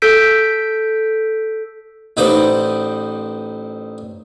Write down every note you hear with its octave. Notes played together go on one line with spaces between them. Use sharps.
A4 E6 G6 B6 D7
A1 D#4 B4 C5 D5